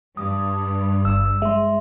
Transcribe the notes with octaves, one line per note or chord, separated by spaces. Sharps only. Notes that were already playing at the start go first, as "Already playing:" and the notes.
G2 D#6
G1 E6
G#3 E5 C6